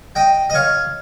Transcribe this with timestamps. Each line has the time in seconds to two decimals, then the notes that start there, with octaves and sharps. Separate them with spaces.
0.15 D#5 G5
0.50 D#5
0.54 C#5 F5